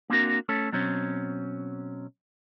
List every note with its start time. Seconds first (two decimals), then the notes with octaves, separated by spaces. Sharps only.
0.10 A#3 C4 D4 F#4 A#4
0.49 A3 C#4 A4
0.72 B2 F#3 C4 C#4